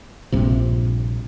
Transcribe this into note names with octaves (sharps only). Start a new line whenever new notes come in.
A#1 G2 C3